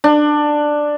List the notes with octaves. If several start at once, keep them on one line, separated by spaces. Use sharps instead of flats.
D4